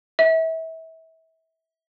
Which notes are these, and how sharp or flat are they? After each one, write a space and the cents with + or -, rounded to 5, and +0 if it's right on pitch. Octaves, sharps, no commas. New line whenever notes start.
E5 -30